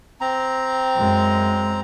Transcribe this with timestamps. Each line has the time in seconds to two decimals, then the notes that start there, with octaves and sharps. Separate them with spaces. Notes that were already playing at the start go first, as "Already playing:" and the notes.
0.21 C4 A#5
0.95 F#2 G#3